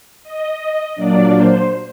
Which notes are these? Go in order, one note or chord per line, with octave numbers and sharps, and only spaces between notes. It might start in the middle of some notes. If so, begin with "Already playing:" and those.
D#5
A#2 F#3 A#3 D4 D5
C5